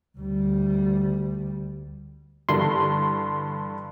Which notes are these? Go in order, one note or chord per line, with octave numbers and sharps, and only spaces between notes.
D2 G3
G2 D3 E3 C6